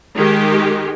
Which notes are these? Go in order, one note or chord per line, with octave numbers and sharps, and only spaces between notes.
D#3 G#3 G4